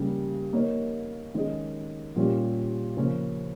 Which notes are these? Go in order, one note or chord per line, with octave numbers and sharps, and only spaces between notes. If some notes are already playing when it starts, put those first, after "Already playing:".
Already playing: C#3 G3 A#3
A#3 D#4 A#4 C#5
D#3 G#3 C#4 G#4 D#5
A#2 G3 C#4 G4
C#3 F3 A#3 C#4